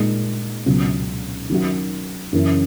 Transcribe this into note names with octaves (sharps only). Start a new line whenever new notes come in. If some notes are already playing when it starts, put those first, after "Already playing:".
Already playing: A#2 G#3 D#4
C#2 B2 F#3
D#3 F#3 C#4 F#4
F#2 C#3 E3